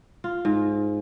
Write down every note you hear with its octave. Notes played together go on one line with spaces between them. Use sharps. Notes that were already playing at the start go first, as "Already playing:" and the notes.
F4
G#2